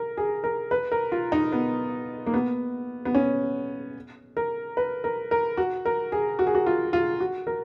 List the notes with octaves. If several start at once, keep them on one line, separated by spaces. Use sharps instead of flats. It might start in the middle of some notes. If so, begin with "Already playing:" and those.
Already playing: A#4
G#4
A#4
B4
A#4
F4
D#4
B3
A#3
B3
B3
C#4
A#4
B4
A#4
A#4
F#4
A#4
G#4
F#4
G#4
F#4
F4
F4
F#4
A#4